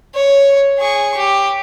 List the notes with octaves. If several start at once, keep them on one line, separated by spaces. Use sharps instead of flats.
C#5
G#4 C#6
G4